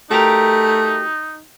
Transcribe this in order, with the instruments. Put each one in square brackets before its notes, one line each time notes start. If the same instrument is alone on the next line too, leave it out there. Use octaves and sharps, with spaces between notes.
[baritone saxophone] A3 [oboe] D#4 [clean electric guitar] F#4 G4 A#4